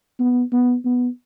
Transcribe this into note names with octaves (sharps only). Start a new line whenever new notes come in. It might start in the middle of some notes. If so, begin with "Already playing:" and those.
B3
B3
B3